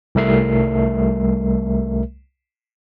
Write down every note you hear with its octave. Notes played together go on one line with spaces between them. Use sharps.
C2 G3 A3 A#4 E5 C7